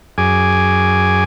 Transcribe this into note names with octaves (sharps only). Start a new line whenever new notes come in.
F#2 G#4 G#5 D6